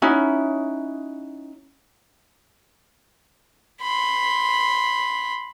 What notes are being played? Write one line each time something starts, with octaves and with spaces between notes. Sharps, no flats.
C#4 D#4 E4 F#4
B5 C6